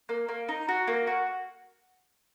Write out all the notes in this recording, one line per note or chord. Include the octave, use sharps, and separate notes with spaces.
A#3
A#3
D#4
F#4
A#3
F#4